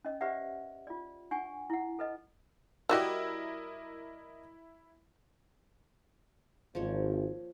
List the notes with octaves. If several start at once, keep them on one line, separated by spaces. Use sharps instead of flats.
C#4 D#5
G4 B4 C5 D5 E5 F#5
F4 D5
D4 F#5 G#5 C#6
E4 F#5
A4 B4 D#5
G3 E4 F#4 G4 A#4 D5 D#5 E6
G#1 F3 A#3 C#5